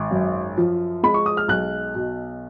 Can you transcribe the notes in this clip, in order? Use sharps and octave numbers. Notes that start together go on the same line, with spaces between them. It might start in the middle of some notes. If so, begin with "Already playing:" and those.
Already playing: G#1
F#2
F3
G#3 B5
C#6
D#6
F6
B1 F#6
B2